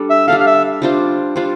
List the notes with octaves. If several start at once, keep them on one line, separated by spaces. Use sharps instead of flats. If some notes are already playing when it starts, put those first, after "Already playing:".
Already playing: G3 D4 A4
E5
G3 D4 A4 F5
F5
E5
G3 D4 F4 C5
G3 D4 F4 C5